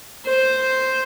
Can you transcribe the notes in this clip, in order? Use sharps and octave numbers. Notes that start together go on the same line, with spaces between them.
C5